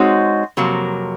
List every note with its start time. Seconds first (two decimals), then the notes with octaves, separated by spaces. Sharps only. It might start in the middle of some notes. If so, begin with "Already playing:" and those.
Already playing: G#3 C4 D#4 F#4 C#5
0.57 F2 C3 F#3 A#3